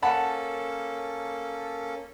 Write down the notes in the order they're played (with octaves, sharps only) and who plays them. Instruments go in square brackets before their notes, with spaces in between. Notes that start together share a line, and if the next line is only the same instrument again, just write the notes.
[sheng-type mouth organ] A#3 C#4 A4 [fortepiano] F#5 A5 B5